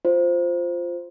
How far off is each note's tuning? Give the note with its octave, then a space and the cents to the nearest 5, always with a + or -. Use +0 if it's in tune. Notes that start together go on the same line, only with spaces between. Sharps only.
F4 +0 C5 +0